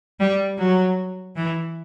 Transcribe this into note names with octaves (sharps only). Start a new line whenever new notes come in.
G3
F#3
E3